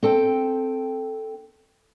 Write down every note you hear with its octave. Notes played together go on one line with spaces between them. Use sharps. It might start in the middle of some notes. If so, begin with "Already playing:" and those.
C4 A4 G5